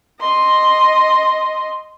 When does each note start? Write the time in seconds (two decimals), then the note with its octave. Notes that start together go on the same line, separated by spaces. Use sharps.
0.20 D#5 C6